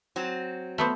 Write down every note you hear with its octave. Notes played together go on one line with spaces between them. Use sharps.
F#3 C4
A3 B3 C5